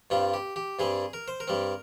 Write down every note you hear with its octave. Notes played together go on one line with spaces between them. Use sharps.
G2 G3 C4 F4
G4
G4
G2 G3 C4 G#4
A#4
C5
A#4
G2 G3 C4